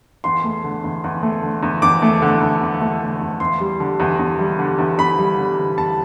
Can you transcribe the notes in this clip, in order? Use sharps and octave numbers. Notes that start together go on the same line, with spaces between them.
E2 C6
A3
D3
E2
E2
A3
D3
E2
E2 D6
A3
D3
E2
E2
A3
D3
E2
E2 C6
G3
D3
E2
E2
G3
D3
E2
E2 B5
G3
D3
E2
E2 A5